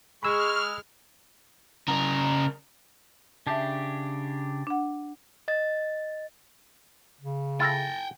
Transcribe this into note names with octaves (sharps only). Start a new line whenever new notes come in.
G#3 B5 C#6 E6 F6
C#3 A#4
C#3 D4 G4 E5 A5
D4 F#5
D#5 A6
C#3
E4 F4 A4 F#5 G5 A6 A#6